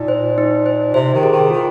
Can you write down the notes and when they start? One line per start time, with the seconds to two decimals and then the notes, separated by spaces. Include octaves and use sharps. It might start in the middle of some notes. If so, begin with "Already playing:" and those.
Already playing: A#2 D#4
0.08 C5
0.38 D#4
0.66 C5
0.94 C3 C5
1.14 D#3
1.23 G#4
1.31 D#3
1.50 D#3 F4